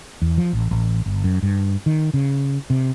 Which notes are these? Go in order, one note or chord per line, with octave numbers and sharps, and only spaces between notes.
E2
F3
A1
A1
G1
F#2
G2
D#3
C#3
C3